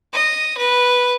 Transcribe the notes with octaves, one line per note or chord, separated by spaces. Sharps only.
D#5
B4